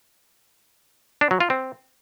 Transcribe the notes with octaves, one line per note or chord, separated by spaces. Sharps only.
D4
F#3
F4
C4